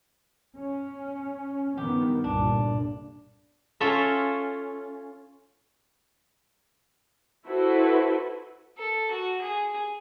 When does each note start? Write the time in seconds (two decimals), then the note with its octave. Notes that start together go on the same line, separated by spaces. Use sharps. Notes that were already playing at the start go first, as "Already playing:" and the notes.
0.56 C#4
1.77 G2 D#3 B3 G4
2.24 G1 C2 A#2 D4
3.80 C#4 F4 A4 C#5 E5
7.46 E4 F#4 A4 B4 C5
8.78 A4
9.11 F#4
9.42 G#4